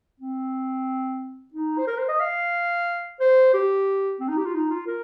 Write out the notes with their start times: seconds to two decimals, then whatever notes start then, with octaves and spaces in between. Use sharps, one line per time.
0.20 C4
1.54 D#4
1.78 C5
1.87 A#4
1.98 C5
2.09 D#5
2.20 F5
3.20 C5
3.54 G4
4.20 C4
4.29 D#4
4.37 G4
4.45 F4
4.54 D#4
4.70 F4
4.87 A#4